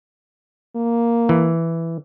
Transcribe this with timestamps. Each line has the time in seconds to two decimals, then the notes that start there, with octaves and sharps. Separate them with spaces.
0.75 A#3
1.29 E3